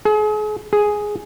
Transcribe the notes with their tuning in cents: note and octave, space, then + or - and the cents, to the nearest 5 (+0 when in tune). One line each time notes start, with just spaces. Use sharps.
G#4 +40
G#4 +5